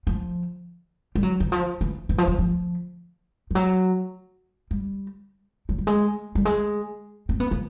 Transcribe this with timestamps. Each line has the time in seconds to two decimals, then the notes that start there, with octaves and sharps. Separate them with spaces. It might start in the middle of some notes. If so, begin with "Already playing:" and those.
0.07 F3
1.15 G3
1.23 F#3
1.40 E3
1.52 F3
1.81 E3
2.09 E3
2.18 F3
2.28 E3
2.39 F3
3.51 F3
3.55 F#3
4.71 G3
5.69 F#3
5.78 G3
5.87 G#3
6.35 G3
6.45 G#3
7.29 C4
7.40 B3
7.51 A#3